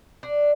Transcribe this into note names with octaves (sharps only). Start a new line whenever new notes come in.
D4